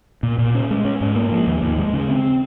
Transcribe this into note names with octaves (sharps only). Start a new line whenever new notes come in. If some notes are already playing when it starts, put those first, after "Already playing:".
A#2
A#2
C#4
G#3
C#4
G#2
A#3
F3
D#2
D#2
G#3
C#3
C4